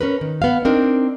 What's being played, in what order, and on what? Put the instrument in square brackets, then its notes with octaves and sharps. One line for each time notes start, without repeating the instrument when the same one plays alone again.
[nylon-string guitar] C#4 A#4 B4
D#3
B3 F5
C4 D4 D#4 A#4